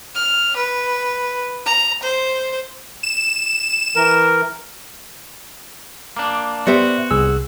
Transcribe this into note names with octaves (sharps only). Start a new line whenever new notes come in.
F6
B4
A#5
C5
E7
E3 A#4
A#3 D4
B3 F#4 G4 C5 D5 E5
C2 G#4 E6